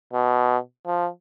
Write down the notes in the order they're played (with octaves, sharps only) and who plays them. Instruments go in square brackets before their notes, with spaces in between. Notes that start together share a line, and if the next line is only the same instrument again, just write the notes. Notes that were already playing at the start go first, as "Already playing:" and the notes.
[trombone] B2
F3